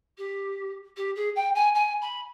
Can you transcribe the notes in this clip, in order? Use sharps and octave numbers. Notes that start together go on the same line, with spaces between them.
G4
G4
G#4
G5
G#5
G#5
B5